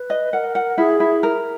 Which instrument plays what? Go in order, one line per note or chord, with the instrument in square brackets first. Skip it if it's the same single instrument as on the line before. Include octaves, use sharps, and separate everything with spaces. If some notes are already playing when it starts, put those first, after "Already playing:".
Already playing: [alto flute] B4
[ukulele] D#5
[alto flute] A#4 [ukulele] F#5
[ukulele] F#5
[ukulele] E4 [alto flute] G#4
[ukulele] E4
A#4